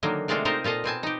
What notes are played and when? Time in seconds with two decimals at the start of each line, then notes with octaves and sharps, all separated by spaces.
0.03 D3 D#3 F#3 A#3
0.28 C3 G#3 A3 D4 F4 F#4
0.45 C4 D#4 F4 A#4 C5 D#5
0.64 A#2 F4 A4 D#5
0.84 B2 C4 G#5 A5
1.03 D#4 G4